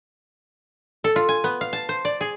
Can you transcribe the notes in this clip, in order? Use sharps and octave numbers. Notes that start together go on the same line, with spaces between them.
A4
F4
G#5
B3
F5
A5
C5
D5
G#4